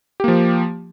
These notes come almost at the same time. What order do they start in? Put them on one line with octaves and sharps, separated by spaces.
G4 A#3 F3